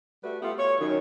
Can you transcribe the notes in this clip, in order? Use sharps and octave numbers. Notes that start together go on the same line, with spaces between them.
G3 A3 F#4 B4
A3 B3 F4 G4
C#5
F#2 D#3